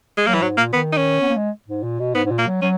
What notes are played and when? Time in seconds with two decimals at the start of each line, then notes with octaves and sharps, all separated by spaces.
0.17 G#3
0.27 F#3 A#3
0.34 E3
0.41 G#2 F#3
0.57 A#2 A#3
0.73 D#3 B3
0.92 D#4
0.97 C#4
1.21 B3
1.29 A#3
1.36 G#3
1.68 G#2
1.83 A#2
1.99 B2
2.14 G#2 B3
2.25 G#2
2.31 A#2
2.39 A#3
2.47 F#3
2.62 F#3 C#4